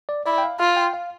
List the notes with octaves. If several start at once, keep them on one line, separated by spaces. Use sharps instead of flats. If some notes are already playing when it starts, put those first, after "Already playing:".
D5
E4 D5
G5
F5
F4 F5
G5
F5